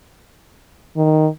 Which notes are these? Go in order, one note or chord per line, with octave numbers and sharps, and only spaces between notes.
D#3